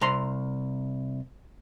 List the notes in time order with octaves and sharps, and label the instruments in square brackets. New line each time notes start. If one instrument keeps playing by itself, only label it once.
[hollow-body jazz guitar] C2 A#5 C6